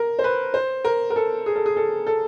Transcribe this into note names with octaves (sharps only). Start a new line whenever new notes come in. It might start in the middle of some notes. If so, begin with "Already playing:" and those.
Already playing: A#4
C5
B4
C5
A#4
A#4
A4
G#4
A4
G#4
A4
A4